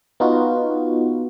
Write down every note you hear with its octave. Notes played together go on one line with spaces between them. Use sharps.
B3 D#4 F4 F#4